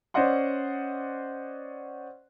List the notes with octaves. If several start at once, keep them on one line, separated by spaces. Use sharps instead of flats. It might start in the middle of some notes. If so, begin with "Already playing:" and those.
C#4 C5 D5 D#5 F#5 C6